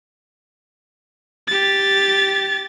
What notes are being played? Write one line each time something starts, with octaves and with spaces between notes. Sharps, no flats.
G4 A6